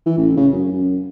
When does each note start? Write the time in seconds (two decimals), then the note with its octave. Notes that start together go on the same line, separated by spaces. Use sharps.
0.06 E3
0.18 A1
0.37 C#3
0.52 F#2
0.73 F#2